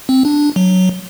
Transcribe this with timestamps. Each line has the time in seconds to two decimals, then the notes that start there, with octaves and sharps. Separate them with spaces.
0.09 C4
0.25 D4
0.56 F#3